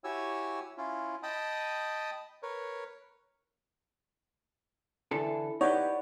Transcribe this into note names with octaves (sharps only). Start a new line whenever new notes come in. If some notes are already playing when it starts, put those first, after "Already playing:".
E4 F#4 G4 C#5 G#5 E6
C#4 E4 F4
D#5 G5 A5 B5 D#6
A#4 B4 C#5
D3 E3 E4 A4
D#4 G4 B4 C#5 D5 F#5